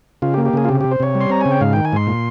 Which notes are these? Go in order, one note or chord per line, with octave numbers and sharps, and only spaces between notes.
C#3 F4
G4
A#3
G4
C#3 G#4
F4
C3 G4
C3 G4
C5
C3 C#5
G3
C6
C4 A#5
C#3 G#5
G5
G#2 F5
D#3 G5
G#5
G#2 C6
A#2